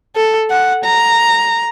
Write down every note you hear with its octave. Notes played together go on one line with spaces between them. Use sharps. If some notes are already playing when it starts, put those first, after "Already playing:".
A4
F#5
A#5